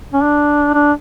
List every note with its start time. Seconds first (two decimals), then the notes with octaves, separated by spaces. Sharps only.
0.13 C#4
0.23 D4
0.74 D4